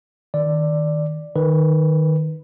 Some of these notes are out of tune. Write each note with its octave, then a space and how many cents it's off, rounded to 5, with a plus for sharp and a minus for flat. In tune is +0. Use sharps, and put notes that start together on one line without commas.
D#3 +0 D5 +0
D#3 -10 B4 +0